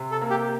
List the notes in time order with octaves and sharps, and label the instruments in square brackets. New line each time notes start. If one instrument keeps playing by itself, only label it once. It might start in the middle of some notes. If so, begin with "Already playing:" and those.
Already playing: [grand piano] C3
[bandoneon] A4
[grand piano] A#3
[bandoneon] G4